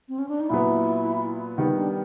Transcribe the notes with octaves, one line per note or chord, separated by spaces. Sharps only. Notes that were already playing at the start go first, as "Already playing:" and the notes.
C4
C#4
D4
D#4
A#2 F#3 B3 E4
D#3 G3 B3 D#4
D4